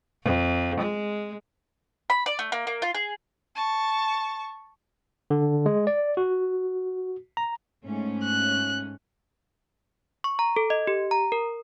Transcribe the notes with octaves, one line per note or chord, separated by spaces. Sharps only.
F2
G#3
B5
D5
A3
A#3
A#3
F4
G#4
A5 C#6
D3
G#3
D5
F#4
A#5
G#2 A3 C#4
F#6
C#6
A#5
A4
D#5
G4
A#5
A#4